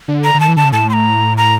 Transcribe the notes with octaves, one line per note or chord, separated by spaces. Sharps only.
D3
A#5
D3
D#3 A5
E3
D3 A5
C#3
A2 A5
C6
A#5
A#5